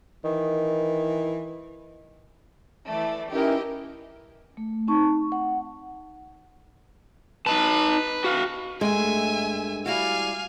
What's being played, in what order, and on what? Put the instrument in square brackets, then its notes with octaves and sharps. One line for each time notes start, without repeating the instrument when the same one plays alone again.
[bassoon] D#3 [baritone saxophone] E3
[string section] E3 A3 D5
[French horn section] E3 D#4 E4 [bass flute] C#4 [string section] G4 D#5 [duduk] A#4
[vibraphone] A3
C4 D#4 A5 C#6
F#5
[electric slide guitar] D#4 D#5 A5 [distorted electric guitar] B4
[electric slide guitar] F#4 F5
[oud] G2 A3 [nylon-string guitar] G#3 [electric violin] E5 G#5
[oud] G3 E4 F#4 [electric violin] F5 G#5